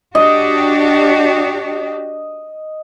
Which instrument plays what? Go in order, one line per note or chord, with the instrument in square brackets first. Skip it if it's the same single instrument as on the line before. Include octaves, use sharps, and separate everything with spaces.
[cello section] D4 F#4 G4 [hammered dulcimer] D#5